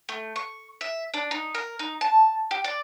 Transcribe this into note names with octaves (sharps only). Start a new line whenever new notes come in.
A3
C#6
E5
D4
D#4
A#4
D#4
A5
G4
D5